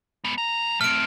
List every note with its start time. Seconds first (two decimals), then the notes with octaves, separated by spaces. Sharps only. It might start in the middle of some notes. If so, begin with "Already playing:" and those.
0.24 G#3 B3
0.38 E2 A#5
0.81 A3 C4 F6 D7